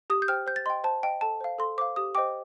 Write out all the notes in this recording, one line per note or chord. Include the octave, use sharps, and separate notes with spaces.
G4 D#6
G6
C5 G5 F6
C5 G6
A6
D#5 G5 C6
C5 A5
D#5 G5
A4 A5
C5 F5
A4 C6
C5 F5 D6
G4 D#6
C5 D#5 G5 D6